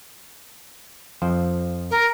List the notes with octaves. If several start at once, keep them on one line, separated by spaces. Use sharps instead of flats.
F2 F3 C5
A#4